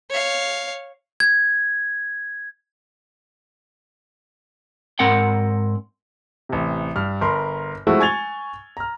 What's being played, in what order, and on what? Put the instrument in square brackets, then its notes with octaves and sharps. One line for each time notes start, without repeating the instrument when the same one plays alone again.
[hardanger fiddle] C#5 F5
[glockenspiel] G#6
[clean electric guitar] G#2 C4 A#4 F#5 G5
[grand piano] A1 C3
G2 F6
G1 A#4 B5 C6
F3 G#3 A3 C4 E4 F#4
G#5 C#6 G#6 A6 F7 G7
A#5 F6